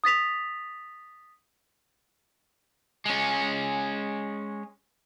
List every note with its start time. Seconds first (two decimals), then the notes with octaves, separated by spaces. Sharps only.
0.04 D#6 A6 B6 F7
3.06 G#3 C#4